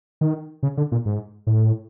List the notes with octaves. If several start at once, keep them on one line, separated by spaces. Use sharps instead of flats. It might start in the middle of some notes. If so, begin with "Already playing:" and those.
D#3
C#3
D3
A#2
G#2
A2